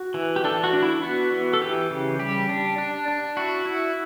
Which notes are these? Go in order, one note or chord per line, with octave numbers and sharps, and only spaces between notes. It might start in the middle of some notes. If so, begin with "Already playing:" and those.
Already playing: F#4
E3
G4
D4 A4
F#4
D4
E4
B3 F#4
E3
A4
E3 G4
C#3
G3 G4
D4
D4
D4
E4 F#4
E4